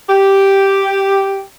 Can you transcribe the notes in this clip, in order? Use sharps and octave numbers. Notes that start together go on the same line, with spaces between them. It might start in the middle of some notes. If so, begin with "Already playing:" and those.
G4